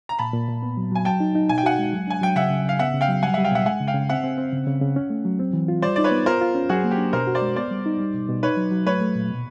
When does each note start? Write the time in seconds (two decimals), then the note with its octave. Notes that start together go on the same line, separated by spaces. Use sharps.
0.09 A#5
0.19 A#2 A5 B5
0.33 A#2
0.48 A#2
0.63 B3
0.77 F#3
0.92 F#3 G#5
1.05 F#3 G5 A5
1.20 D#4
1.35 D#4
1.49 B2 G#5
1.58 G5
1.63 F#4 F#5 G#5
1.79 G#3
1.93 F#3
2.07 D4 G#5
2.21 F#3 G5
2.35 C#3 E5 F#5
2.50 C#3
2.65 C#3 F5
2.79 B3 E5 F#5
2.94 C#3
3.01 F5 G5
3.09 F#3
3.23 G3 F#5 G#5
3.34 G3 E5 F#5
3.44 F5 G5
3.52 B2 E5 F#5
3.66 G#3 F#5 G#5
3.80 C#3
3.88 F5 G5
3.94 C#3
4.09 C4 E5 F#5
4.24 C4
4.38 C4
4.53 C#3
4.67 C#3
4.81 C#3
4.96 C#4
5.10 A3
5.25 F#3
5.39 C4
5.53 E3
5.68 F4
5.82 G3 C5 D5
5.96 D#4 D5
6.04 B4 C#5
6.11 B3
6.26 F4 A#4 C5
6.41 F4
6.55 C#4
6.69 F#3 F#4 G#4
6.84 A#3
6.91 G4
6.98 D4
7.13 B2 A#4 C5
7.27 F#4
7.35 C5 D5
7.42 G#3
7.56 B3 C5 D5
7.71 G3
7.86 D#4
8.00 G3
8.14 B2
8.29 B2
8.43 D#4 B4 C#5
8.57 F#3
8.71 F#3
8.86 A3 B4 C#5
9.01 A3
9.15 A#2
9.30 B2